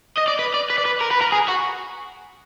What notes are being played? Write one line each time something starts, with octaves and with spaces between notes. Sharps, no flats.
D#5
D5
B4
D5
B4
D5
B4
A#4
B4
A#4
G#4
F#4